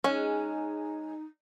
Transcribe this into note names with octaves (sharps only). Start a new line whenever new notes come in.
G#3 C#4 D#4